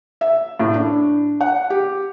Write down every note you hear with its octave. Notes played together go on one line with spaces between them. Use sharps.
E5
A2
D4
F#5
G4